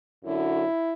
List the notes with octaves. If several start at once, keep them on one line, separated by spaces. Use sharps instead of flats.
F#2 D3 F#3 E4